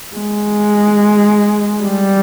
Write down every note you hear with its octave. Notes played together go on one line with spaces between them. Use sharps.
G#3
G3